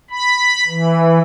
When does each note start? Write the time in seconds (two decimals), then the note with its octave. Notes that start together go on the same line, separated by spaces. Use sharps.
0.10 B5
0.68 E3